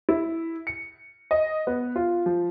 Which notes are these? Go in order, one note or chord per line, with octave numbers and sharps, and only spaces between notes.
E4
C#7
D#5
B3
F4
F3